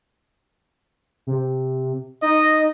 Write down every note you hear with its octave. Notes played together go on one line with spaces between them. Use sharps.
C3
D#4 D#5